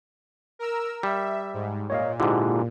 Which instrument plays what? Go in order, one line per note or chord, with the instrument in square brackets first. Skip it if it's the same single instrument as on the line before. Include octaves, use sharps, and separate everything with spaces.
[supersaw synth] A#4 E6
[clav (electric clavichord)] G3 [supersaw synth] E5
[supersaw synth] G#2
[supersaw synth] A#2 [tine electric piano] C#5 D#5 F5
[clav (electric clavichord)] G#2 D3 [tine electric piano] E4 F4 G4